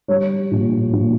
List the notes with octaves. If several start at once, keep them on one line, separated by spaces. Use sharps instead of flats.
G3 C#5
A#2
A#2